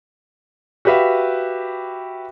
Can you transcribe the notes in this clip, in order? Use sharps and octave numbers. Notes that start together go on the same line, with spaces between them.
F#4 G4 B4 E5 F5